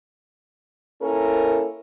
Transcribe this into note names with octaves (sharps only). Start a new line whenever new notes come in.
A#3 C#4 E4 A4 A#4